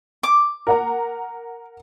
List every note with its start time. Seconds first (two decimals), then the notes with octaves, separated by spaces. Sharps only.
0.23 D6
0.67 A#4 F#5 A#5